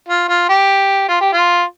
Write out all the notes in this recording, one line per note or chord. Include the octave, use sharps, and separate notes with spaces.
F4
F4
G4
F4
G4
F4